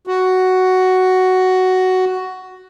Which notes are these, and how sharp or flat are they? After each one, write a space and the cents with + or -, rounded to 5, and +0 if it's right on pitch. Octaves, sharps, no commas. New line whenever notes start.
F#4 +5